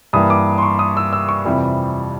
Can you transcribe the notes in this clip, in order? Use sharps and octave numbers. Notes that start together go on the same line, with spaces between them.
G2 E3 G3 A#3 D#6
D6
C6
C#6
D#6
E6
E6
C#6
F2 C3 E3 G3